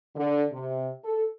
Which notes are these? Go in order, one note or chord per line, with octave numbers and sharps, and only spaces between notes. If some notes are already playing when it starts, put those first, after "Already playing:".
D3
C3
A4